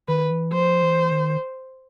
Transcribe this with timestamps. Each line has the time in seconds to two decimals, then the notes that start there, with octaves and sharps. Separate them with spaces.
0.08 D#3 B4
0.31 E3
0.52 F3 C5
0.83 E3
1.12 D#3